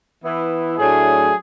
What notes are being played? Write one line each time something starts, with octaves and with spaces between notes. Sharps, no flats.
E3 B3 E4
A2 F#3 A3 D4 G#4